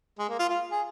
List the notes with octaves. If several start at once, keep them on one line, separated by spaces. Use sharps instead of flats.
G#3
A#3
F4
F4
G#4